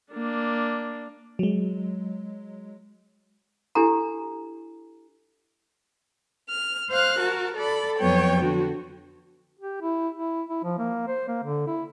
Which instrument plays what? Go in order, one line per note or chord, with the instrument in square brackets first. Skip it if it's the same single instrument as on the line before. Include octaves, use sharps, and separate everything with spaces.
[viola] A#3 D4
[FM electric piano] F#3 G#3
[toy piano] D4 E4 G4 A4 G#5 A#5
[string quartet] F6
C5 F5 F6 F#6
F#4 A#4 A5
A4 D5 B5
F2 F#3 B3 C#5 G5
D3 F#4
[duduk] G4
E4
E4
E4
F3
A#3
C5
A#3
D3
E4